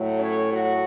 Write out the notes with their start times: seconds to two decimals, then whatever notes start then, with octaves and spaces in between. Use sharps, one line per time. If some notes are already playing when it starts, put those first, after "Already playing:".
Already playing: A2 F#3 A3
0.19 C#4 C#5
0.51 F#3 F#4